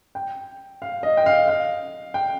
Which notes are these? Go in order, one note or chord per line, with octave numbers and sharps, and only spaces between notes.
G5
F5
D#5
G5
F5
F5
G5